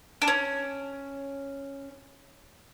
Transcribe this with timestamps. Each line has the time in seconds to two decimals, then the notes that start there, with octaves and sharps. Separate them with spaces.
0.22 D4
0.28 C#4